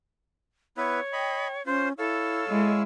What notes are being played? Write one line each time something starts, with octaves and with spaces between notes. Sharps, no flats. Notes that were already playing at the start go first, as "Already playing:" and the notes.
B3 E4 B4 C#5
D#5 G5 B5
C#4 F4 C5
E4 A4 C#5 F5 E6
G#3 E4 D#5